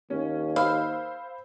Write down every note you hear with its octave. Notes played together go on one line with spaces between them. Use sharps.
D#2 C#4
C5 F5 B5 E6